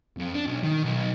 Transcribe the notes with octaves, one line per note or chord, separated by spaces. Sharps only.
F2
D4
B1
D#3
B1